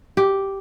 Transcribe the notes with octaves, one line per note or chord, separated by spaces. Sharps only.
G4